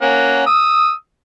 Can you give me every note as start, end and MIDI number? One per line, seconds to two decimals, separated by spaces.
0.02 0.44 58
0.02 0.44 61
0.02 0.44 78
0.46 0.92 87
0.46 0.92 88